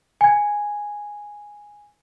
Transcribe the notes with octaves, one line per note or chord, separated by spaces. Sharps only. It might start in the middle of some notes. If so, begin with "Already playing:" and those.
G#5 G#6